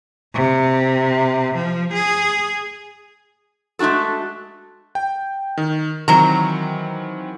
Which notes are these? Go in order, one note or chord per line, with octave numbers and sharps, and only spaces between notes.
C3
F3
G#4
G#3 A3 D4 F#4 A4
G5
D#3
D#3 E3 F#3 C4 A#5